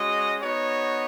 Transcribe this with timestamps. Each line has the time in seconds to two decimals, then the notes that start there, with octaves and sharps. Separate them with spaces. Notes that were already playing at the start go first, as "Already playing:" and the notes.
Already playing: G#3 C#4 F#4 D#5
0.42 B3 D#4 F#4 C#5